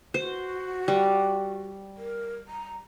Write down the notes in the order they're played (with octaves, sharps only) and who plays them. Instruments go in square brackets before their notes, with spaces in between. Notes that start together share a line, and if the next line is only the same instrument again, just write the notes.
[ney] F#4 [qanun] C5
[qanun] G3
[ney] A#4
A#5